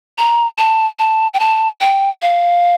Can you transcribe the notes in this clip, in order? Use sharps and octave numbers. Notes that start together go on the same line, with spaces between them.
A#5
A5
A5
G5
A5
G5
F5